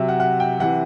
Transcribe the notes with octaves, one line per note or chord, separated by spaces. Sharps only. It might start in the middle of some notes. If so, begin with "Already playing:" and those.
Already playing: C3 F#3 E5
F#5
F#5
G5
C3 E3 F#5